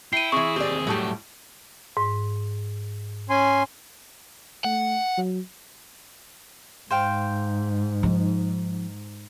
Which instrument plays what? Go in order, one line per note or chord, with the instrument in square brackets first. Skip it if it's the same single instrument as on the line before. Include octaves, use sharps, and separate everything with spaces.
[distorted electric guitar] E4 [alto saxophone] G5 [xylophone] C7 D#7
[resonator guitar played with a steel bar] E3 C4 [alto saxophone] G#4 [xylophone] C#6
[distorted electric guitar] D#2 C4 [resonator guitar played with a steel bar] G4 D5
[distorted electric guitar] A2 G3 [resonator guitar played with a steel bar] F#3 A3 G4
[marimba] G#2
[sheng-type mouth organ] C#4 G#5 C6
[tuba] A3 [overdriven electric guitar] F#5
[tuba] F#3
[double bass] G#2 [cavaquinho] C5 F5 G5
[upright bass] F3 D#4